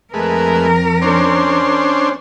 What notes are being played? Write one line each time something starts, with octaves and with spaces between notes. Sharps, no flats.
F2 G#3 A3 A#4 B4
C#4 D4 C5